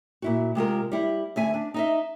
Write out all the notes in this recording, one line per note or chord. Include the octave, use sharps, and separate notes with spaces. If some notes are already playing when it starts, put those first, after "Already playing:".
A#2 E4 F#4
C3 G#3 F4 A#4
G3 E4
D2 E5 G#5
D4
D#4 D#5 E5